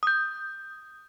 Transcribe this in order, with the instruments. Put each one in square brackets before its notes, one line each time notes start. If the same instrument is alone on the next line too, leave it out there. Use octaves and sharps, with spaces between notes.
[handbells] D#6 G6